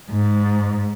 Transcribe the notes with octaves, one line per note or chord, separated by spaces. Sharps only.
G#2